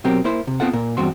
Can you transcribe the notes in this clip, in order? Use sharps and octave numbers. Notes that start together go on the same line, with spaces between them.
B2 F#3 C4 G4 A#4
A#3 E4 C5
C3
B3 C4 F4 A4 F#5
A#2 A#4
E2 G2 C4 F#4 C6